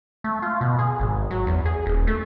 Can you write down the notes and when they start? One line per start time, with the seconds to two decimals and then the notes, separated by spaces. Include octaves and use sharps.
0.24 A3
0.42 F4
0.61 B2
0.79 G#4
1.00 G#1
1.30 F#3
1.47 E2
1.65 G#4
1.86 D#1
2.07 A3